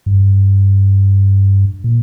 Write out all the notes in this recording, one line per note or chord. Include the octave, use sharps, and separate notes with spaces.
G2
A#2